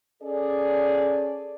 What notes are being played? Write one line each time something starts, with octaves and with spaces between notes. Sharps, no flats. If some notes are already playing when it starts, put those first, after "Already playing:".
C#4 G#4 A4 C#5 D5